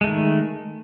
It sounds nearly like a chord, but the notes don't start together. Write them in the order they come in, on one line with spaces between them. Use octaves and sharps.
G#3 A3 D#3